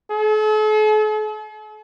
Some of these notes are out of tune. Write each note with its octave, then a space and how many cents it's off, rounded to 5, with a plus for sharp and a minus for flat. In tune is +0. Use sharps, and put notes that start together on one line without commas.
A4 -45